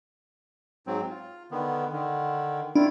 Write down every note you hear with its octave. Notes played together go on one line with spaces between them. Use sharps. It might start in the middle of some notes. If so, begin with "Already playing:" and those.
G#2 F#3 C4
F4
D3 D#3 B3
D3 D#3
D#3 D4 E4 F4